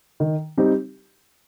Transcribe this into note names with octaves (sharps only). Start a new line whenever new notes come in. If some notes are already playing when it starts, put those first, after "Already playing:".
D#3
G3 C4 D#4 G4